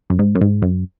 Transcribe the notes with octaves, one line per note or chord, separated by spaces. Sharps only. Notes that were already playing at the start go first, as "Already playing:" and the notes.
F#2
G#2
F#2
G#2
F#2